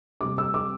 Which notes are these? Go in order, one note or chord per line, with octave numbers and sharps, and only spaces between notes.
C3 G3 C4 D6
E6
D6